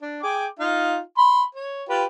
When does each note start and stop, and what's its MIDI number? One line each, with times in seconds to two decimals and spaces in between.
0.02 0.20 62
0.23 0.46 68
0.23 0.46 79
0.23 0.46 86
0.59 0.99 63
0.59 0.99 65
0.59 0.99 77
1.18 1.43 83
1.18 1.43 84
1.55 1.83 73
1.89 2.05 65
1.89 2.05 67
1.89 2.05 71